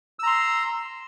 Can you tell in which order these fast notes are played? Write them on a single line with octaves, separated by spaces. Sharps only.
E6 A#5 C6